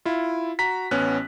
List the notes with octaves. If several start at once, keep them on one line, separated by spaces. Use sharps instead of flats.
E4 F4
F#4 A#5 B6
A1 B3 C#4 F#6